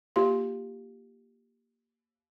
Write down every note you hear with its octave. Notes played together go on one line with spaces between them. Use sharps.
A#3 F4 G4 F5 C6